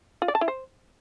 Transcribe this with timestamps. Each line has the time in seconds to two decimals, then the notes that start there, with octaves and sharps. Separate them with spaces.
0.22 F4
0.28 D5
0.35 A5
0.41 E4
0.48 C5